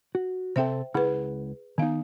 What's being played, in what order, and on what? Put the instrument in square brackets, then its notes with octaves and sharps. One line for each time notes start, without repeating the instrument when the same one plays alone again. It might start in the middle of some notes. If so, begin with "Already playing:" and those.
[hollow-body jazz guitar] F#4
[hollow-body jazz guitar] C3 C4 A4 [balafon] C5 E5 G5
[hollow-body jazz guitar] C#2 E4 F#5 [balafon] G#4 B4
[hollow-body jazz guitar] D#3 D#4 [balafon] B3 F5